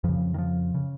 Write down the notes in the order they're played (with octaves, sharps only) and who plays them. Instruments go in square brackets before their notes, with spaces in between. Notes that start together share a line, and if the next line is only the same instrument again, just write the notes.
[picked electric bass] F2 C#3 F3
D#3
F3
C#3